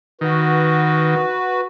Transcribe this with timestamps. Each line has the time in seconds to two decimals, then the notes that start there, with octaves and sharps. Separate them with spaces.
0.21 D#3 F#4 B4